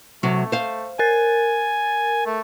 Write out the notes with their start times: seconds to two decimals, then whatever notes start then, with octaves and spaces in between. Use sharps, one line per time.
0.23 C3 F#3 A3
0.52 C5 F5
0.99 A#4 G#5 A6
2.26 A3